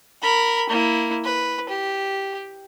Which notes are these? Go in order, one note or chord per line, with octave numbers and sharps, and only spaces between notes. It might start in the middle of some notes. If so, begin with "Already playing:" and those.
A#4 B5
A#3 E4
B4
G4